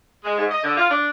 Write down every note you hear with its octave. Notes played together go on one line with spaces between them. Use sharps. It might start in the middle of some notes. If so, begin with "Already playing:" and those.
G#3
G#2
D#5
D3
F4
D4